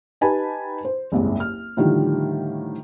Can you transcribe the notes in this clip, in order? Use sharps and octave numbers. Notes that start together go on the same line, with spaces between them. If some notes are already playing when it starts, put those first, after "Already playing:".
D#4 G4 B4 G#5 A5 B5
C5
F#1 C2 G#2
F6
A2 D3 D#3 F3 G3